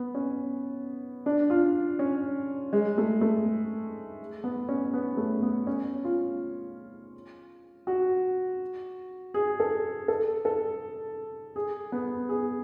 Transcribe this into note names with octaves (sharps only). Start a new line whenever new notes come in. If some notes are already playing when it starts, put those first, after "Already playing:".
Already playing: B3
C#4
D4
F4
C#4
G#3
A3
A3
B3
C#4
B3
A3
B3
C#4
F4
F#4
G#4
A4
A4
A4
G#4
B3
G#4